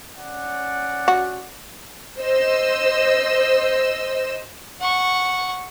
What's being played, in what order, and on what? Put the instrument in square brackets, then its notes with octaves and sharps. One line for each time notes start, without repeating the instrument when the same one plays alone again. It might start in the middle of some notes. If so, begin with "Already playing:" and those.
[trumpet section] C#4 D5 F#5
[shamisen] F#4
[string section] C5 D#5 E6
[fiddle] F#5 C#6